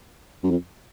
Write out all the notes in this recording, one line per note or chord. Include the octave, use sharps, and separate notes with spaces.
F#2
F2